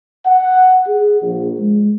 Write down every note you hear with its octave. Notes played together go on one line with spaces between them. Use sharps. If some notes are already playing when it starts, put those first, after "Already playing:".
F#5
G#4
A#1
G#3